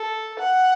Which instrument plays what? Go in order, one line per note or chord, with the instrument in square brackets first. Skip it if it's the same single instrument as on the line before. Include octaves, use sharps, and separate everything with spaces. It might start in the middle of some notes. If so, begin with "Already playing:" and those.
Already playing: [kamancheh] A4
F#5